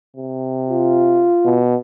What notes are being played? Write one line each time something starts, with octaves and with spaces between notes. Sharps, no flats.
C3
F4
B2